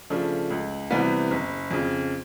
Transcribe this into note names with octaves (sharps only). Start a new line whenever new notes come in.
C#3 F3 A3 D4
C#2
C3 E3 G3 B3
F#1
F2 C#3